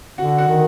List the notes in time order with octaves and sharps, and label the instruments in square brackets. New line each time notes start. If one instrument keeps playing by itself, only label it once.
[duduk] D3 [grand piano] F#4 F#5
[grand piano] F#4 F#5
[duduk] D#3